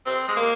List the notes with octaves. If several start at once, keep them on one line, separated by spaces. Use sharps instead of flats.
C4
G#3
A#3